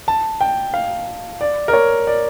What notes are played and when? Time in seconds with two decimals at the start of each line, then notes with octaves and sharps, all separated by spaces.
0.08 A5
0.41 G5
0.74 F5
1.41 D5
1.68 A#4
1.73 C#5
2.07 D5